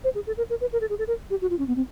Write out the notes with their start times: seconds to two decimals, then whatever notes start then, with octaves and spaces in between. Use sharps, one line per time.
0.04 C5
0.15 G#4
0.27 A4
0.37 A#4
0.50 A#4
0.61 B4
0.73 A#4
0.81 A4
0.90 G#4
0.99 A4
1.08 A#4
1.30 G4
1.41 F#4
1.50 F4
1.59 C#4
1.68 B3
1.76 C4